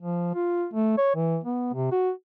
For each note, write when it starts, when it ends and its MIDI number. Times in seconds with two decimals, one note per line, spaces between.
0.01 0.31 53
0.34 0.65 65
0.74 0.96 57
0.98 1.11 73
1.16 1.38 52
1.44 1.71 59
1.73 1.91 48
1.92 2.10 66